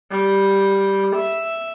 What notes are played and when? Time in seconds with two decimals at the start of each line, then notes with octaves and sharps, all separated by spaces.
0.11 G3
1.16 E5